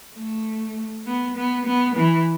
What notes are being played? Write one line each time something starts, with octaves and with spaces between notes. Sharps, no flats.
A3
B3
B3
B3
E3